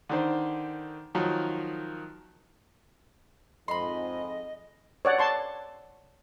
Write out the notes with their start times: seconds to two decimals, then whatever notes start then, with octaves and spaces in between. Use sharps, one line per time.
0.09 D3 D#3 C5
1.15 D#3 F3 F#3 D#4
3.68 F2 G#2 D#5 B5 C6
5.05 C#5 D5 F#5
5.18 A5 C6 C#6